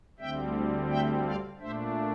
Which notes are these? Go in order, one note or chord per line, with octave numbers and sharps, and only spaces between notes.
D2 D3 G3 C4 E5 G5
E5 G5
D5 F5
A#2 A3 D4 C5 E5